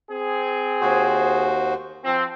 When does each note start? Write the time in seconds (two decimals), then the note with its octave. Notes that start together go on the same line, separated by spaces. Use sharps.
0.10 C4 G#4
0.81 D#2 F#4 C5
2.05 F3 C4